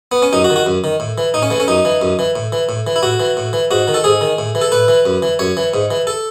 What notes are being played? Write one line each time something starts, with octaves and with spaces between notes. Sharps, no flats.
B3
C#4
F#2 D#4
F#4
D#3
F#4
F#2
D#3
A2
E3
A2 D#4
C#4
E3 A3
C#4
F#2 D#4
E3
F#2
E3
A2
E3
A2
E3
E4
A2 F#4
E3
A2
E3
G#2 F#4
D#3
A4
G#2 G#4
D#3
A2
E3
A4
A2 B4
E3
F#2
E3
F#2 C#5
E3
G#2
E3
A4